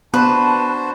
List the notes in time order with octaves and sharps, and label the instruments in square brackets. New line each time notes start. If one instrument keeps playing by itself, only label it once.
[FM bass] B3 [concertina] D4 F#4 C5 [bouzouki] B4 [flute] A5